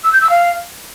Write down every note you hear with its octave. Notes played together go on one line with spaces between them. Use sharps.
E6
G6
E6
F5